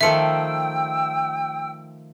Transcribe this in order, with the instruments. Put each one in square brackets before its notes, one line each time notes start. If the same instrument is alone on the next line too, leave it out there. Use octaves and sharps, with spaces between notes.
[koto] D#3 F3 A3 [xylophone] E5 C#7 [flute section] G5 E6